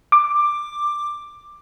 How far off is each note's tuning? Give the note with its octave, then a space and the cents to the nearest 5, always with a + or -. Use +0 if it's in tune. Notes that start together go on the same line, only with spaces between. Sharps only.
D6 +10